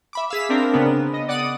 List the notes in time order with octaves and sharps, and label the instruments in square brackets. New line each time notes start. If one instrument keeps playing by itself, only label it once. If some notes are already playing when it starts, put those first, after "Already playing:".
[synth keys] E5 B5 D6
[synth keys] G#4 F5 [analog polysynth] E6 B6
[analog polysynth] C4 D4 A#4
[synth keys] C#3 B3
[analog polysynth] D#5
D5 F#5 D#6